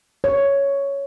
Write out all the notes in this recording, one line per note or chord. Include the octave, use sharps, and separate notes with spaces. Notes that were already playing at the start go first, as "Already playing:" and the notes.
C#5